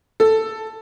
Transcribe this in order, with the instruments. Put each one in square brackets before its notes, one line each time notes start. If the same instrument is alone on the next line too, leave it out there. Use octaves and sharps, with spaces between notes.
[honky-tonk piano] A4